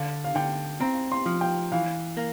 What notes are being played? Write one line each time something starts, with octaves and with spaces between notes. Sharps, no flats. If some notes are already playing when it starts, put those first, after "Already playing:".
Already playing: D3 F5
F5
D3 G5
C4 A#5
C6
F3
G5
E3 F5
A#3